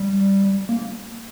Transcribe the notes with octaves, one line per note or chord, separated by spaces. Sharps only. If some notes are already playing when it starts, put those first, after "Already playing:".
Already playing: G3
A#3